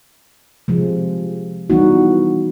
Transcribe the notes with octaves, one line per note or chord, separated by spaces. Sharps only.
C3 F3 G#3
E3 G3 B3 D#4 F#4